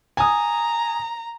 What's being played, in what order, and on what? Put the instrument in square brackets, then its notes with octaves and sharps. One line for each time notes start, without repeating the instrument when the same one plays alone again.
[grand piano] G#5 D#6 [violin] A#5